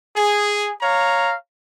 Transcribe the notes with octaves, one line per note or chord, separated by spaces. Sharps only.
G#4
C#5 F5 A#5